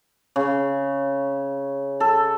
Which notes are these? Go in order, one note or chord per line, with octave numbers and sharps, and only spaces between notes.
C#3
A4